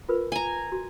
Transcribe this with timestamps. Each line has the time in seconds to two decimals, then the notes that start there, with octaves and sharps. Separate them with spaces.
0.09 F4 A#4 B4
0.32 G#5 A#5
0.72 F#4